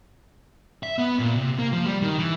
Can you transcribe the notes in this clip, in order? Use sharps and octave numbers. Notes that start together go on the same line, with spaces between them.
E5
B3
A#2
C3
A#3
F3
G3
D#3
E3